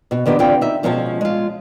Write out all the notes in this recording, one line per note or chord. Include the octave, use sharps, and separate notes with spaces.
B2 F#4
D3 D#3 B3 G4
E2 D3 B3 C4 F4 G5
D#4 E5
B2 F3 G#3 C#4 E5 A5
G#3 F4